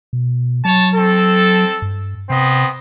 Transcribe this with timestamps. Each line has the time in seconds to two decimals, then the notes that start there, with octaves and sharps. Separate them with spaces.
0.13 B2
0.65 F#3 C#5 A5
0.95 C4 A4
1.82 G2
2.30 C3 B3 C4 D#5